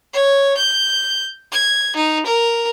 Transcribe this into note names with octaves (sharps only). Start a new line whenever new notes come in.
C#5
G6
G#6
D#4
A#4